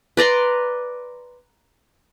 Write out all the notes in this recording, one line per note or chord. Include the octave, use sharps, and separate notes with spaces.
B4 D5 A#5 C6